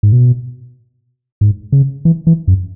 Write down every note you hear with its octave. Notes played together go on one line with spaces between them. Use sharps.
G#2
B2
G#2
C#3
E3
E3
F#2